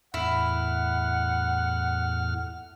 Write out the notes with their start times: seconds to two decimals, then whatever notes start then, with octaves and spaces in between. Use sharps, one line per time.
0.14 E2 A2 E4 F#5 F6